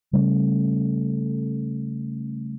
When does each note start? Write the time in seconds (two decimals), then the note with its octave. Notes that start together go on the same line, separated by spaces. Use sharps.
0.13 C#3 G3 A3 C#4